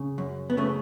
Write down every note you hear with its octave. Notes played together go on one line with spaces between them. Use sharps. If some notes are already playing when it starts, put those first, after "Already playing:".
Already playing: C#3
F#2
B3
C#3 A3